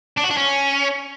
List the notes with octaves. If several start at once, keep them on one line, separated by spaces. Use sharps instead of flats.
D4
F#4
D4
C#4